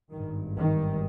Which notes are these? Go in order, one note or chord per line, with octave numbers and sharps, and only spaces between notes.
G#1 G2 D#3
D#3